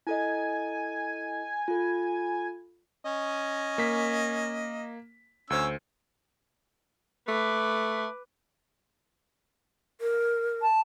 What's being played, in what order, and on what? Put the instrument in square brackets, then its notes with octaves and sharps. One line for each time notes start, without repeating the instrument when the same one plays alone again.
[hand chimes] E4 A4 D#5 [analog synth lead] G#5
[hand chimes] F4 A4
[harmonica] C#4 D#5
[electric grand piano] A#3 B6
[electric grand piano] D2 C5 [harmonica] C#4 E6
[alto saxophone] A3 [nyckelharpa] B4 D6
[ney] A#4
[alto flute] A5